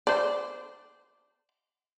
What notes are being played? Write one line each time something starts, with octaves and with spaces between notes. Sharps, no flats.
C5 D5